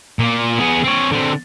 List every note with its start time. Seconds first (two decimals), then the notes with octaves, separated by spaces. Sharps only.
0.19 A#2 A#3
0.58 B3 G#4
0.84 C4 C#5
1.11 D3 C4